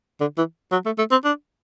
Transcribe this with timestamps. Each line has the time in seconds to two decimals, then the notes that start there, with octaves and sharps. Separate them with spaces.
0.21 D3
0.38 E3
0.72 F#3
0.86 A3
0.98 A3
1.11 C4
1.24 D4